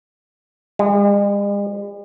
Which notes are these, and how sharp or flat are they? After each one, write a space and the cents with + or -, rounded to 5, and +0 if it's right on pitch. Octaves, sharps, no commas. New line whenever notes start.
G#3 -45